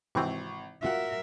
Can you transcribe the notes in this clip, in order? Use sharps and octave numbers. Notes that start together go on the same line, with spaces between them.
G#1 C3 E3 C4 C#6
F4 F#4 A#4 E5 F#5